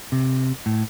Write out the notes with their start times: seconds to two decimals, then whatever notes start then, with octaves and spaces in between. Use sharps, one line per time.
0.12 C3
0.66 A2